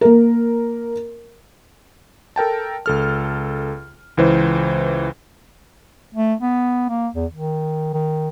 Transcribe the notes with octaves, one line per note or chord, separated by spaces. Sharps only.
A#3 A#4
A4 A#4 G5 A5
C#2 A4 F6
C#2 E3 C5
A3
B3
A#3
E2
D#3
D#3